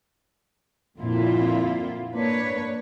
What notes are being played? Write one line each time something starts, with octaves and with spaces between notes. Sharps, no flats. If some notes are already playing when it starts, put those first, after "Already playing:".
F2 A#2 D3 C4 E4 F4
A#3 D4 B4 C#5